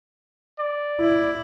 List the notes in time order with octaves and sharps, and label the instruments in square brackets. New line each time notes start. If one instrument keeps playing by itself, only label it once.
[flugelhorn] D5
[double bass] E4